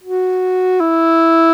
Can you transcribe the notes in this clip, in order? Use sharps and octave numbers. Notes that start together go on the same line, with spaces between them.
F#4
E4